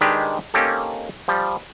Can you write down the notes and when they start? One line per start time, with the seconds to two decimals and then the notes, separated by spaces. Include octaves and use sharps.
0.01 D#3 G#3 D4 G4 B4
0.54 A#3 C4 C#4 D#4 G4 A4
1.28 F3 G3